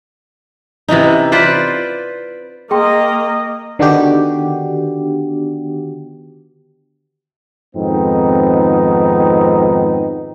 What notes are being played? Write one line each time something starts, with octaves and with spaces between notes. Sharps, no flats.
C3 E3 C#4 D#4
F4 B4 C5 D5
A#3 G#4 D#5 G5 C6
D3 D#3 B3 D4 F#4 G4
F2 G#2 D#3 B3 C4 D#4